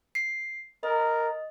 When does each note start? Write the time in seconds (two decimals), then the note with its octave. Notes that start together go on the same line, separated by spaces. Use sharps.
0.15 C7
0.83 A#4 D#5